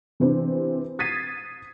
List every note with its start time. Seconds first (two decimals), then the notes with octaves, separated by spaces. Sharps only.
0.20 C3 E3 C4 D4
0.99 D#6 G#6 A6 B6 C7 D#7